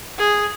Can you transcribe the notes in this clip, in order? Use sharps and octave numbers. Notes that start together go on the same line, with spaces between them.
G#4